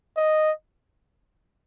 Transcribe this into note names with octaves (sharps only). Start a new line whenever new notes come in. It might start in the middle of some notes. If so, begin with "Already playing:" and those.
D#5